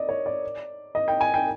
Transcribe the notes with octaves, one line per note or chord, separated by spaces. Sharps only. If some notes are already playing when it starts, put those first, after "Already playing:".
Already playing: D5 D#5
C#5
D5
D#5
G5
G#5
G5